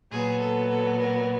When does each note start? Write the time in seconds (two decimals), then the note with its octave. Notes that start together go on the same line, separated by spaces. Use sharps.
0.11 A#2 F#3 B3 G#4
0.40 A4
0.69 A4
0.98 A#4